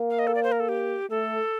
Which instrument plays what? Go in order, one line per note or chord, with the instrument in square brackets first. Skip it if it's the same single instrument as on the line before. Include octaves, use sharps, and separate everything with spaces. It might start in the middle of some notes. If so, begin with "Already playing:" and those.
Already playing: [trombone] A#3
[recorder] F5
D#5
A4
D5
C5
A#4
A4
G4
[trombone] A3 [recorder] A4